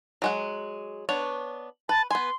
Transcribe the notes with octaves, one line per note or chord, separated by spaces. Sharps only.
F#3 G#3 F#5
B3 D4 C#5
B4 A5
B3 G#5 C6